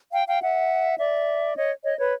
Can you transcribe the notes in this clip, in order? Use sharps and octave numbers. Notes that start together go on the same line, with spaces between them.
F5 G5
F5 G5
E5 F#5
D5 E5
C#5 D#5
C#5 D#5
B4 C#5